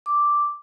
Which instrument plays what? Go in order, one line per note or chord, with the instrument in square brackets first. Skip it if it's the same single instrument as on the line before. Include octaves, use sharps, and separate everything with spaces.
[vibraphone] D6